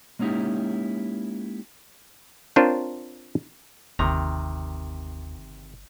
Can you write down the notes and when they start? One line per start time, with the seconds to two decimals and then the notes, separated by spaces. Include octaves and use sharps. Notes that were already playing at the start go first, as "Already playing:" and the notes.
0.19 G#3 A#3 C#4 D#4 E4 G4
2.56 C4 D4 F4 A#4 C5 C#5
3.99 G1 D#2 C3 D#3 A#5